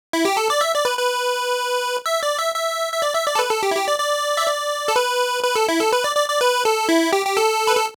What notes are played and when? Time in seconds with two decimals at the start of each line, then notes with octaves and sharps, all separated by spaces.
0.13 E4
0.25 G4
0.37 A4
0.50 D5
0.61 E5
0.74 D5
0.85 B4
0.98 B4
2.06 E5
2.23 D5
2.38 E5
2.54 E5
2.93 E5
3.02 D5
3.15 E5
3.27 D5
3.35 A4
3.39 B4
3.51 A4
3.63 G4
3.71 E4
3.75 G4
3.88 D5
3.99 D5
4.37 E5
4.47 D5
4.88 A4
4.96 B4
5.44 B4
5.55 A4
5.69 E4
5.80 A4
5.93 B4
6.04 D5
6.16 D5
6.28 D5
6.41 B4
6.65 A4
6.89 E4
7.13 G4
7.26 G4
7.37 A4
7.67 B4
7.76 A4